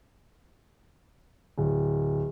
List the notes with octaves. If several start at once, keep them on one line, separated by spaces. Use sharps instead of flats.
D1